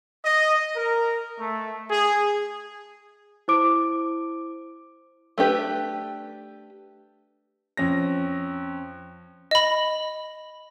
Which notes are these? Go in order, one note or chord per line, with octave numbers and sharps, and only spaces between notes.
D#5
A#4
A3
G#4
E4 C5 D6 D7
A3 D4 G4 B4
F2 C#4 A#6
D#5 B5